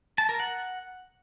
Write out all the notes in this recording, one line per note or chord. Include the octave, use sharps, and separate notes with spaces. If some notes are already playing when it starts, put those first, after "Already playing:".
A5
A#4
F#5